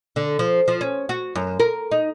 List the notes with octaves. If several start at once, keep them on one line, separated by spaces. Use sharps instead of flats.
D3
F3
F3
C#4
F#4
F#2
A#4
D#4